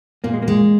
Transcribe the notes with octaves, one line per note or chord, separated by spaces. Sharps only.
A#2 A#3
G#3
A#3
G#3